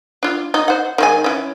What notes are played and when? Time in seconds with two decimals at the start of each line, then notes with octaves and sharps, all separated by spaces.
0.23 D4 F4
0.54 D#4
0.68 C5 F#5
0.98 D#3 G#3 G#5
1.24 E3 C#4